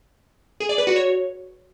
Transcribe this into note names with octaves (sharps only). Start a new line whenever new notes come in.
G#4
D5
B4
F#4
C#5